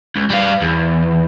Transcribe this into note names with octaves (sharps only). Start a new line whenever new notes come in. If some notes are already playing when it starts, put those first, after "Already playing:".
C#2
G3 F5
E2